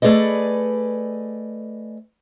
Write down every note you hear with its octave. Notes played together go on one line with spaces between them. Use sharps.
A3 G#4 B4 D5 D#5